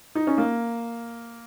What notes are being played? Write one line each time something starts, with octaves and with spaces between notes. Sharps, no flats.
D#4
C#4
A#3